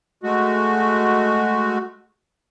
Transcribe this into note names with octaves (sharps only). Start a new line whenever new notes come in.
G#3 A3 F#4